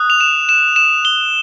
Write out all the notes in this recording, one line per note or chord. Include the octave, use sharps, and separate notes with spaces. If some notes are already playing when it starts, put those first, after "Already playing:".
Already playing: D#6 F#6
F7
E7
E7
E7
G7